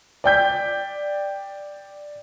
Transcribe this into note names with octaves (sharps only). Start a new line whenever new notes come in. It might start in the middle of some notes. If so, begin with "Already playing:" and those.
D5 G5 G6 B6